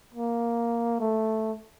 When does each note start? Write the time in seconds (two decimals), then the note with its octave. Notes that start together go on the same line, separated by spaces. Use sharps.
0.14 A#3
1.00 A3